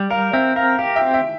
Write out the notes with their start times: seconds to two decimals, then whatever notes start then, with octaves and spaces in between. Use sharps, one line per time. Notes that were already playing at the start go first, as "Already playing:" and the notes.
Already playing: G3
0.10 A#4 F5
0.33 C4 E5
0.56 A#4 F5
0.78 G4 F5
0.96 E5 G5
1.02 C4
1.14 E5